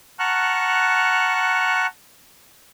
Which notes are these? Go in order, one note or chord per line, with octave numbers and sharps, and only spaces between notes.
F#5 A5 A#5 C#6 F6 F#6